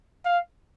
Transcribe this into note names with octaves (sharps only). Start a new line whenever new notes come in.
F5